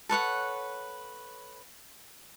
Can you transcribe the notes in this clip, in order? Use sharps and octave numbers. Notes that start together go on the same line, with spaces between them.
A4 B4 C#5 F#5